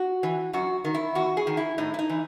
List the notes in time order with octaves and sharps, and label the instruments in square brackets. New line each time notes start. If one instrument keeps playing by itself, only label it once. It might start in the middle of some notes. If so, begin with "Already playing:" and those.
Already playing: [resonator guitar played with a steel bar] F#4
E3
F#2 F#4
D#3
E4
E2 F#4
G#4
D#3
E4
A2 D#4
E4
D#4
E3